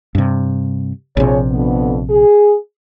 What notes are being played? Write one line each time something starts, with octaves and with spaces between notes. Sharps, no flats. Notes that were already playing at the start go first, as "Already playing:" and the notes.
G2 C3
A#1 C3 F3 G#4 C#5
F2 D3 B3
G#4